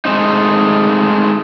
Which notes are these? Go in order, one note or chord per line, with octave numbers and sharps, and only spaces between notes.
G#3 A3 C4 D#4